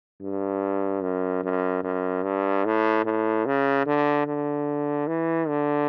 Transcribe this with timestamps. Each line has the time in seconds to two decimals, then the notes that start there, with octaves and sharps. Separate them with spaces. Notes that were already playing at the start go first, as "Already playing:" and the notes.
0.22 G2
1.02 F#2
1.43 F#2
1.83 F#2
2.23 G2
2.65 A2
3.05 A2
3.46 C#3
3.86 D3
4.27 D3
5.07 E3
5.48 D3